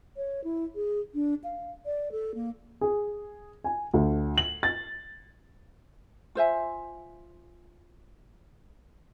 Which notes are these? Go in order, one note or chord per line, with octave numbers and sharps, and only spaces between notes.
C#5
E4
G#4
D4
F5
D5
A4
A#3
G#4
G#5
D2
F#7
A6
F4 C5 E5 G#5